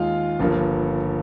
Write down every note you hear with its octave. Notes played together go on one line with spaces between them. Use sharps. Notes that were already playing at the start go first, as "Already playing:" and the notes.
Already playing: D#2 D#3 G#3 D#4 F4 F5
G1 G2 F3 A#3